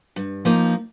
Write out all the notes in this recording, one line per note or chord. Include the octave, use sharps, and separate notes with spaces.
G2
F3 A#3 D#4